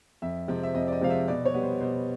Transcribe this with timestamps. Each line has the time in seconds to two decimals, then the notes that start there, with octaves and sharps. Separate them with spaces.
0.22 F2 E5
0.48 C3 F3 G#3 C4
0.63 E5
0.75 F2 D#5
0.88 D5
0.92 D#5
1.01 C3 F3 G#3 C4 F5
1.10 E5
1.28 B2 D5
1.45 C#5
1.54 G3 B3
1.63 C5
1.80 B2 C5